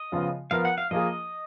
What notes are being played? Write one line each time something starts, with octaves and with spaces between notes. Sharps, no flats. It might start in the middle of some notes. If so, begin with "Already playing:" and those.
Already playing: D#5
C#3 F3 B3 F4
F3 B3 F4 A#4 F5
F#5
F5
F3 A#3 F4 G#4 D#5